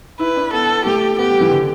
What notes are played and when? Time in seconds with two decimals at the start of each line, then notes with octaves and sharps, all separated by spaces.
0.19 E4 B4
0.36 D4
0.53 B3 A4
0.85 A3 G4
1.18 B3 G4
1.30 G3
1.41 E3
1.51 D3